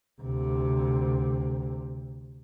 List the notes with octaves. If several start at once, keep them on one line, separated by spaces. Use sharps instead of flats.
D2 C3